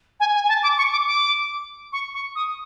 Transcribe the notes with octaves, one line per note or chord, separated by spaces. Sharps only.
G#5
G#5
A5
D6
C#6
D6
D6
C#6
C#6
D#6